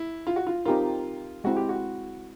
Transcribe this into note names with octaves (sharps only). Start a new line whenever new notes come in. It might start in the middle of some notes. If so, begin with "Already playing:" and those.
Already playing: E4
F4
F#4
F4
C4 D#4 F4 G4 A#4
G#3 C4 E4 F#4
G4
F#4